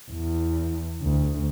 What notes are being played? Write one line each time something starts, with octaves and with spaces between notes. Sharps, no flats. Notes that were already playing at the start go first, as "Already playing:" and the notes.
E2
D2